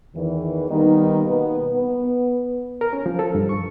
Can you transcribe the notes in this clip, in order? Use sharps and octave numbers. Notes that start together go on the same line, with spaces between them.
E2 D#3 E3
D#3 G3 A#3 B3 D#4
B2 B3
B3
A#4
C#4
F3
A4
G2
C#6